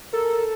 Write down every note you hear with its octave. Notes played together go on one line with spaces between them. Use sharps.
A4 A#4